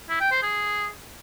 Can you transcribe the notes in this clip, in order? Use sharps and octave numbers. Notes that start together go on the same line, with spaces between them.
E4
G5
C5
G#4